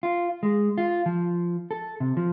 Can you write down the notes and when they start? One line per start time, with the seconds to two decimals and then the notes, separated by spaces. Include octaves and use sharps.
0.03 F4
0.43 G#3
0.78 F4
1.06 F3
1.71 A4
2.00 C3
2.17 F3